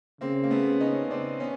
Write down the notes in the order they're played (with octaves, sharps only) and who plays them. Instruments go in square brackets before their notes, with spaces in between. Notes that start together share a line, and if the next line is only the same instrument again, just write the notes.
[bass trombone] C#3 [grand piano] A#3 C4
[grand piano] A#3
A3 B3
C#4 D#4
C4 D4
B3 C#4